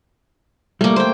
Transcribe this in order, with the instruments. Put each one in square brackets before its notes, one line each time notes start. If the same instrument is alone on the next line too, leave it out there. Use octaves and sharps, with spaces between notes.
[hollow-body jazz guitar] G3 [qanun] A3 A#3
[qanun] C5 G5